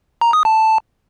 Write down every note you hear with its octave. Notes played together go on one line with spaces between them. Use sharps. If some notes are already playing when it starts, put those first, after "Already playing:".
A#5
D#6
A5